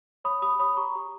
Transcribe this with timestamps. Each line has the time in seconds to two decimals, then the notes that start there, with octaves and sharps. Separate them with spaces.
0.24 C#5 B5 D#6
0.42 G4 B5 D#6
0.59 C#5 B5 D#6
0.77 G4 A#5 C#6
0.95 G4